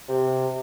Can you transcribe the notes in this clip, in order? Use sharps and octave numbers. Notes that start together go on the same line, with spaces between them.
C3